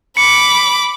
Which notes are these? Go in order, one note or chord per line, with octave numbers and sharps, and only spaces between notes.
B5 D6 C#7